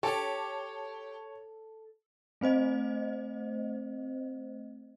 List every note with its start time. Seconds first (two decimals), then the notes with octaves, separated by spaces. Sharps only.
0.03 G4 A4 C#5 A5
2.41 A3 C4 C5 D#5